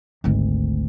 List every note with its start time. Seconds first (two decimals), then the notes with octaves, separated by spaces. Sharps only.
0.24 G#1 D2